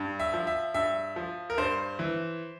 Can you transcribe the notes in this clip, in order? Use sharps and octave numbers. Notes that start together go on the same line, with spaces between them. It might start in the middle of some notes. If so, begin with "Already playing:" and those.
Already playing: G2
E5
F3
E5
G2 E5
F3
A#4
G2 C5
E3